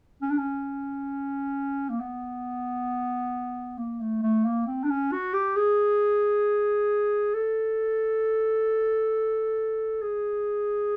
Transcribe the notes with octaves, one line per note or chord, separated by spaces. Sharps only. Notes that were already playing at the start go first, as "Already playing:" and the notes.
C#4
D4
C#4
A#3
B3
A#3
A3
A3
A#3
C4
D4
C#4
F#4
G4
G#4
A4
G#4